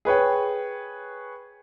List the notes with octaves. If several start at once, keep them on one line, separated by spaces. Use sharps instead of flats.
G#4 B4 C#5 G5